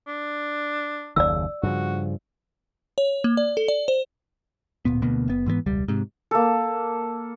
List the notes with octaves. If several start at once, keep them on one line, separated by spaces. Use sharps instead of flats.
D4
F#1 D#2 C#3 D5 E6
G2 C#3 F3 F#4
C#5
A#3
D5
A4
D5
C5
D1 A#2 B3
D2 B2 A#3 B3
F#1 B3
G#2 E3 A3 B3
E1 C#2 G3
G#2 C3
A#3 A4